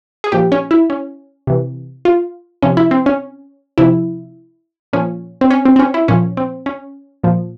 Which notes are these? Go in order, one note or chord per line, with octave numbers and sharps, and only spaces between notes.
G#4
A#2 F3 G4
C#4
E4
C#4
C3 E3
F4
C3 F3 C#4
E4
C4
C#4
C3 F3 E4
A#2 F3 C#4
C4
C#4
C4
C4
C#4
E4
A#2 F3 C#4
C4
C#4
A#2 F3